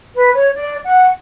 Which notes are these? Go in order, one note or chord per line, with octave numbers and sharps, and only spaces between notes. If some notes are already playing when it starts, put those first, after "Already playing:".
B4
C#5
D5
F#5